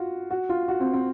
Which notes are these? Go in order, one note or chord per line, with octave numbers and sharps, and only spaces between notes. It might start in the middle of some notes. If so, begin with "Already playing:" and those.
Already playing: F4 F#4
F#4
F4
F#4
C4
C4